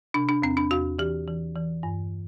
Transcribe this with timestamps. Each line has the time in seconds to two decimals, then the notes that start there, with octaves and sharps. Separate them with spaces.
0.14 C3 D4
0.29 D4
0.42 E2 C4
0.57 D4
0.71 E2 F#4
0.99 E3 G4
1.28 E3
1.56 E3
1.83 G2